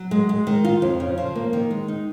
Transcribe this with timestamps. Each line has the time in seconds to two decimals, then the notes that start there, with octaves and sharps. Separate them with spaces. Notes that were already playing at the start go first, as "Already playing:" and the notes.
Already playing: F#3
0.11 G#3
0.29 G#3
0.47 D#3
0.65 F4
0.82 F2
1.00 C#3
1.18 F3
1.36 A#3
1.53 D#3
1.71 G#3
1.88 D#4